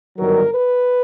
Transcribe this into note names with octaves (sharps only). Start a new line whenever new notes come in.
G1 G2 D#3 F#3 A#4
B4